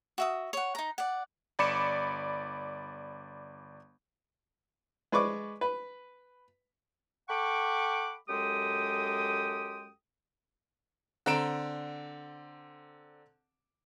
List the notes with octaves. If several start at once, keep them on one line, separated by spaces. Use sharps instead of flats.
F#4 E5 D#6
C#5 F#5
D#4 A#5
D5 F#5
G1 D5 B5 D6 C#7 E7
G#3 B4 D5 C#6 D6
B4
A4 F#5 G5 B5 C#6 D6
F#2 G#3 G4 A4 G5 D#6
D3 C4 A#5 D7 E7